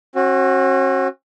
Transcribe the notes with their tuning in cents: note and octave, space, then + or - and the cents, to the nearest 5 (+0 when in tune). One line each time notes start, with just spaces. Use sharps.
C#4 -45 F#4 +0